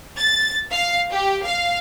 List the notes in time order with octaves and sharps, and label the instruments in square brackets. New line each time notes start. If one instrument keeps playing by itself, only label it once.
[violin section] A6
F5
G4
F5